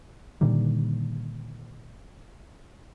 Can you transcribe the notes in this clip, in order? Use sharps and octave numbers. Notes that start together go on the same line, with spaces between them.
A#2 D3 D#3 G3